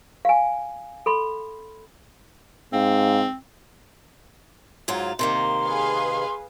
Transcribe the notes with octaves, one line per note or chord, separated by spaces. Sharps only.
F5 G#5
A4 B5 C6
G#2 C4 F5
G#2 F#3 F4
C3 D#3 A#3 C6
G#4 B4 F5